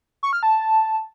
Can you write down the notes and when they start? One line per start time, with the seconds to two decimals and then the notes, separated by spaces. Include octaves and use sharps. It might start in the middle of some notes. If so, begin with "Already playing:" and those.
0.23 C#6
0.33 F6
0.43 A5